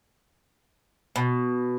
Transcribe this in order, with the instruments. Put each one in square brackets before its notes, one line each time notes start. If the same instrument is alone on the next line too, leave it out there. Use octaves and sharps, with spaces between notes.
[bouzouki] B2